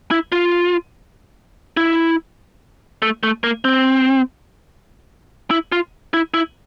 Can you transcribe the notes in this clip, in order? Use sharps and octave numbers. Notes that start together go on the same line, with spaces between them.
E4
F4
E4
A3
A3
A#3
C4
E4
F4
E4
E4